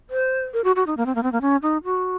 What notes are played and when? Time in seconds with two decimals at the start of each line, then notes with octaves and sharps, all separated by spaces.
0.10 C5
0.53 A#4
0.64 F#4
0.76 F#4
0.87 D#4
0.97 A#3
1.06 C4
1.15 A#3
1.23 C4
1.32 A#3
1.41 C#4
1.62 D#4
1.85 F#4